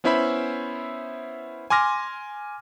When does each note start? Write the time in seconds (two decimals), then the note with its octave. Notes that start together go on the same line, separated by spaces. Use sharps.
0.04 B3 C#4 E4 C5 E5 B5
1.70 G#5 C6 D6 F6 A#6